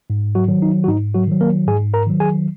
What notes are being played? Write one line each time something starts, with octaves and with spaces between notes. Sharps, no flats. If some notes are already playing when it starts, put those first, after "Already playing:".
G#2
F#3 F#4
D#3 F#3
D#4
F#4
G#2 D#4
F#3 F#4
D#3 F#3
A#3 A#4
G#2 G#4 G#5
A#4 A#5
D#3 F#3
G#4 G#5